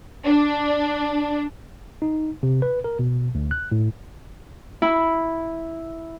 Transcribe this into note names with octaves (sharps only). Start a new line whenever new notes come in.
D4
D#4
C3
B4
A#4
B2
D2
F#6
A2
E4